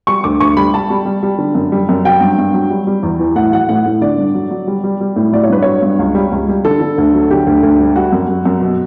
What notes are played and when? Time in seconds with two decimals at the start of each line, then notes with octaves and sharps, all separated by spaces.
0.07 G3 C#6
0.24 D2 D6
0.40 D2 C#6
0.57 G3 B5
0.74 G3 A5
0.90 G3
1.06 G3
1.23 G3
1.38 D3
1.55 F#2
1.72 G3
1.89 F#2
2.05 F#3 G5
2.21 G2
2.38 G2
2.54 F#3
2.70 G3
2.87 G3
3.03 E2
3.19 E3
3.35 A2 F#5
3.53 F#3 F#5
3.69 A2 F#5
3.86 A2
4.02 D3 D5
4.18 G2
4.34 F#3
4.51 F#3
4.68 G3
4.84 G3
5.01 G3
5.16 A2
5.33 F#3 D5
5.44 C#5
5.49 G2 B4
5.62 F#3 C#5
5.82 G2
5.99 C#2
6.15 G3
6.32 C#2
6.49 G3
6.65 D3 A4
6.81 D3
6.98 D2
7.14 F#3
7.30 D3 G4
7.47 D2
7.63 D2
7.80 G3
7.95 G3 F#4
8.12 F#2
8.29 F#2
8.45 F#2
8.61 B2